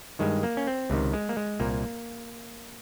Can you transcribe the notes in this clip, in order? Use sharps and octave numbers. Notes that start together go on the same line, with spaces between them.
G2 D#3 G#3
A#3
C#4
C4
C#2 C3 D#3
G#3
A#3
G#3
C2 A#2 A#3